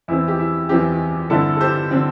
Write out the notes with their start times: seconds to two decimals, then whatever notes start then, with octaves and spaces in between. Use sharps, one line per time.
0.08 E2 E3 C4 E4
0.28 G4
0.39 E4
0.69 E2 E3 C4 G4
1.30 G2 D3 C4 E4 A4
1.56 A4
1.60 G4 C5
1.91 D3 C4